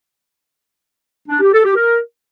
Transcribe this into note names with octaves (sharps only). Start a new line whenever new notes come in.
D4
G4
A4
G4
A#4